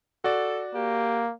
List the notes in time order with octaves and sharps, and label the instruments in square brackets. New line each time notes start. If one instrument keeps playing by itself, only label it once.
[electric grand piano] F#4 D5 [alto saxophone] A4
[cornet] A#3 [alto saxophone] G4